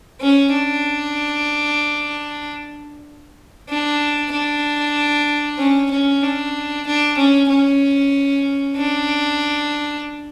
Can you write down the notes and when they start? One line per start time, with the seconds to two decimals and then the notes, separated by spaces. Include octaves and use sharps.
0.21 C#4
0.53 D4
3.69 D4
4.32 D4
5.59 C#4
5.91 C#4
6.23 D4
6.86 D4
7.18 C#4
7.49 C#4
8.76 D4